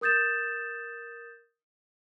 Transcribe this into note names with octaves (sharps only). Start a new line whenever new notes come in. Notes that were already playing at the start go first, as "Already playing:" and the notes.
A#4 D#6 G6 A6 E7